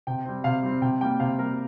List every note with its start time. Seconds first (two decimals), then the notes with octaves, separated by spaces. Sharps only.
0.07 C3 G5
0.25 G3 C4
0.44 C3 F5
0.63 G3 C4
0.82 C3 G5
1.01 G3 A#3 G5
1.20 C3 F5
1.39 G3 A#3 A#4